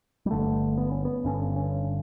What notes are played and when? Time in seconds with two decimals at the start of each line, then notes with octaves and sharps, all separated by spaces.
0.26 G3
0.31 G1 G2 D3 A3
0.77 B3
0.91 C#4
1.05 B3
1.25 G1 G2 D3 C#4
1.56 C#4